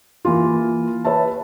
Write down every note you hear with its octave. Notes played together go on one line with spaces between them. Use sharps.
E3 A#3 F4
B4 C#5 E5 A5